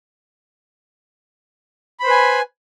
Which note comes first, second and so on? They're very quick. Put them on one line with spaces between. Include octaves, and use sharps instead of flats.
B5 C5 B4 G#5